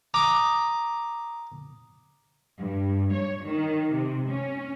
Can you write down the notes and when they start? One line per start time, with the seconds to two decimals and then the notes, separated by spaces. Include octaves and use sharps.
0.14 A#5 D6 D#6
2.59 G2
3.14 C#5
3.45 D#3
3.93 C3
4.29 C#4